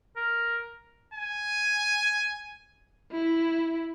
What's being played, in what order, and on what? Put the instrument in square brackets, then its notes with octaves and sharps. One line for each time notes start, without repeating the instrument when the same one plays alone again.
[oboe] A#4
[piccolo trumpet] G#5
[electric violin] E4